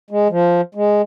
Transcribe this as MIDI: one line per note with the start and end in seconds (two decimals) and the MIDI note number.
0.11 0.28 56
0.30 0.61 53
0.75 1.02 56